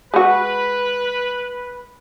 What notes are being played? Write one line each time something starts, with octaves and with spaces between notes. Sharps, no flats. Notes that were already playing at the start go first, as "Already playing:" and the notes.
G#3 F#4 B4